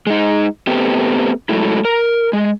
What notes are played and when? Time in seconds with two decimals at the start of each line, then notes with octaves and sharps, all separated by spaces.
0.07 G#3 D#4
0.67 A3 B3 C4 G4
1.49 F#3 G#3 A3 E4
1.85 A#4
2.33 G#3